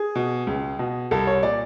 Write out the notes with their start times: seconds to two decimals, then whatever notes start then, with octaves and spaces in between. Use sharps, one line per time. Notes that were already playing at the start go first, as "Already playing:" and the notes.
Already playing: G#4
0.15 B2
0.47 C#2
0.79 B2
1.11 C2 A4
1.27 C#5
1.43 A#2 D5